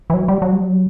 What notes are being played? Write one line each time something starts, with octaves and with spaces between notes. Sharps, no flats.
E3
F#3
G3
F#3
G3
F#3